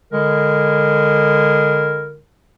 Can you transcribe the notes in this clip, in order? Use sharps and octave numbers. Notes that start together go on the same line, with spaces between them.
D3 G#3 E4 A#4